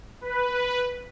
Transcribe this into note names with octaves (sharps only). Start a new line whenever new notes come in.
B4